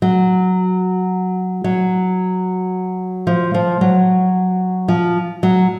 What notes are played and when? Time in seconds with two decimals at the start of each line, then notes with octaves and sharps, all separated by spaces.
0.02 F#3
1.64 F#3
3.27 F3
3.54 F3
3.81 F#3
4.88 F3
5.43 F#3